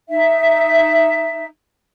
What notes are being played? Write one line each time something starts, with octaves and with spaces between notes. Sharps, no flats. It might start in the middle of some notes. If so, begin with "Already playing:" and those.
D#4 E5